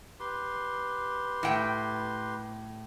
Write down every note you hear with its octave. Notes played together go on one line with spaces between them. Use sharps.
G4 B4 C6
A2 G5